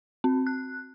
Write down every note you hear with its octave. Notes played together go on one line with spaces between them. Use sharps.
C4
F#6